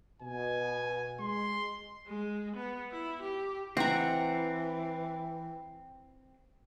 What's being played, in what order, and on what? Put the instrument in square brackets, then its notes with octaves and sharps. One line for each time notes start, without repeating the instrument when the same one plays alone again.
[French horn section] B2 [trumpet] G#5
[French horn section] G#3 [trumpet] C6
[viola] G#3
B3
E4
G4
[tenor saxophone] E3 [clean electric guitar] C4 [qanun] F#5 A#5